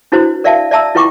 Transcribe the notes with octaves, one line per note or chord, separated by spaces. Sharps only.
D4 E4 F#4 B4 C5
A#4 D5 E5 F5 A5
D5 E5 A5 A#5 E6
E4 F4 B4 G5 C#6 D6